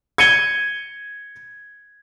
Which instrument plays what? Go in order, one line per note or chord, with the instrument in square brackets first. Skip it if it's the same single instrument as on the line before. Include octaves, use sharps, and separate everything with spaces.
[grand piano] G#6 C#7 D#7 G7